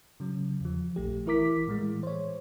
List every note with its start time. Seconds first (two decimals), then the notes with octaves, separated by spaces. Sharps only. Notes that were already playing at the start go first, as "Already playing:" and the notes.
0.20 C#3 F#3
0.61 E2 F3
0.96 A#1 A3 G4
1.26 E3 E4 A#4 D6 B6
1.67 A2 E3 G#3
2.03 C5 C#5